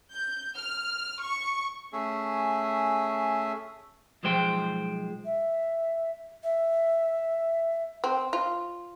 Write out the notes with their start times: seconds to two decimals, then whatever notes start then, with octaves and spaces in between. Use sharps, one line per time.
0.13 G6
0.56 F6
1.21 C#6
1.93 A3 C#4 G#4 E5
4.23 B1 F3 G#3 C5 G5
5.25 E5
6.43 E5
8.04 C4
8.33 F4